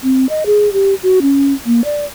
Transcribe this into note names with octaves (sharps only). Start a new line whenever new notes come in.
C4
D#5
G#4
G4
F#4
C#4
A#3
D5